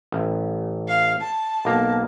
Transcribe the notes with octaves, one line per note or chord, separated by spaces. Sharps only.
A1
F5
A5
B1 A#3 A#5